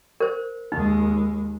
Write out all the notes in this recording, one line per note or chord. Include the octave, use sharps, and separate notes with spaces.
A#4 C5
D#2 G#3 D#4